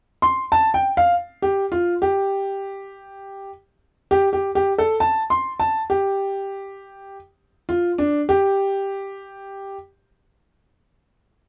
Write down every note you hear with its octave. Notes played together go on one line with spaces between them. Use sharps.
C6
A5
G5
F5
G4
F4
G4
G4
G4
G4
A4
A5
C6
A5
G4
F4
D4
G4